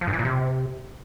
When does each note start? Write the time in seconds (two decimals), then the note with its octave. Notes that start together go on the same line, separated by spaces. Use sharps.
0.01 F3
0.07 G2
0.13 E3
0.19 A#2
0.25 C3